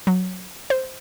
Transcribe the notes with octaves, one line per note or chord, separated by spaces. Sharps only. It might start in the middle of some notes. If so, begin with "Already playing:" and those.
F#3
C5